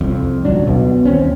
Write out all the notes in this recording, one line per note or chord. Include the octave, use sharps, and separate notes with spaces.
C2 F2
D#1 C#2 F#3 D4
B1 B2
D#2 C4 C#4